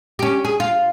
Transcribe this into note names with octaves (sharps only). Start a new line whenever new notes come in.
C#4 G4
G#4
F4